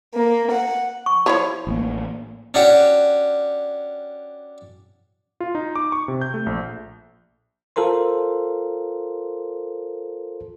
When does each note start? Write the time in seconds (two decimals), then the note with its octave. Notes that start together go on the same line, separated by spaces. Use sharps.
0.14 A#3
0.52 F#5
1.06 C#6
1.26 F3 E4 C#5
1.67 A1 A#3
2.54 C#4 D4 F#4 G4
5.40 F4
5.55 D#4
5.76 D6
5.92 C#6
6.08 C3
6.21 G6
6.34 A3
6.46 A#1
7.76 F4 A4 A#4 C5 C6